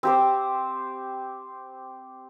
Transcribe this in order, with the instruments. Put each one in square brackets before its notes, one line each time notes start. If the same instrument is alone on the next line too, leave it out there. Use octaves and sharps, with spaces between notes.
[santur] C4 G4 C5